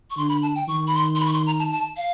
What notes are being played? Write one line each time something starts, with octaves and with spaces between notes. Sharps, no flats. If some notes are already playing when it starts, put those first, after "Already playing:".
C#6
D3 C6
B5
A5
G5
D#3 C#6
B5
C6
C6
B5
C#6
C6
A#5
A5
A5
F5